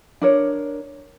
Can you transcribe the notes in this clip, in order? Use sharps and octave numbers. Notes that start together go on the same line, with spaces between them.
D4 A#4 C#5